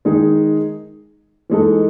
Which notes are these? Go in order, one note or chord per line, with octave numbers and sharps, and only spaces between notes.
D#3 G#3 D#4 G#4
E3 G#3 D#4 A4